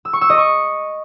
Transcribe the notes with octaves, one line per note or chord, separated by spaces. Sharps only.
E6
C#6
E6
D#5
C#6